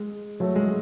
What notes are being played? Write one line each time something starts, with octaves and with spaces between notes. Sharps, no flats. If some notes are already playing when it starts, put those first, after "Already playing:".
Already playing: G#3
F#3 A3
G#3